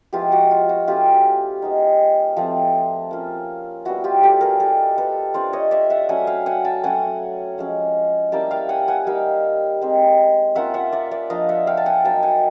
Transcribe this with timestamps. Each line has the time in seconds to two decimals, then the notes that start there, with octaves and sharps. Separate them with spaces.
0.13 F3 G#3 B3 E4 F4 G4
0.32 F#4
0.51 F4
0.69 F#4
0.87 A3 C#4 E4 F4 G4
1.62 G#3 B3 D#4
2.37 F3 A3 C4
3.11 A#3 C#4 F4
3.85 G3 B3 E4 F#4
4.04 F4 G4
4.23 G4 A4
4.41 G#4 A#4
4.60 A#3 D#4 G4 A4
4.98 A4 B4
5.34 A3 D4 F4 C5 D5
5.53 C#5 D#5
5.71 D5 E5
5.90 E5 F#5
6.09 F#3 A3 C#4 F#5 G#5
6.27 F5 G5
6.46 F#5 G#5
6.65 G5 A5
6.84 F#3 A3 C#4 F#5 G#5
7.58 F3 G#3 C#4
8.32 G3 A#3 C#4 E4 G5 A5
8.51 F5 G5
8.69 F#5 G#5
8.88 F#5 G#5
9.07 G3 A#3 D#4 F5 G5
9.82 G#3 C4 D#4
10.55 A#3 C#4 F4 E5 F#5
10.74 E5 F#5
10.92 D5 E5
11.11 D5 E5
11.30 F3 A#3 D4 D#5 F5
11.49 E5 F#5
11.67 F5 G5
11.77 A5
11.86 F#5 G#5
12.04 F#3 A#3 D#4 G5 A5
12.23 F#5 G#5